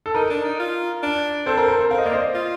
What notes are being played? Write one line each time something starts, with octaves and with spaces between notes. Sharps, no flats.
A4
D#4 A#4
D4
D#4
F4
D4
C4 A4 C5
A#4
A#4
A4 C5
C4 F5
D#5
A#3 D5
C5 D#5
F4